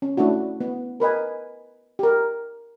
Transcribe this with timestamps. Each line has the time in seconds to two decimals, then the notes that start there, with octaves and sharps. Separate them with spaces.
0.02 C#4
0.17 A3 D4 E4 F#4
0.61 B3
1.00 A#4 B4 D#5 G#5
1.99 G4 A#4